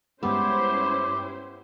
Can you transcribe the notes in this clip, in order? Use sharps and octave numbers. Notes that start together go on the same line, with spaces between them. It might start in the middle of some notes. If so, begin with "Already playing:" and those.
G2 G#3 B3 C#4 E4 G4 C5